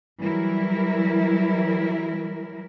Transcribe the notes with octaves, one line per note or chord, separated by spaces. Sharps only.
E3 F#3 G3 E4 A#4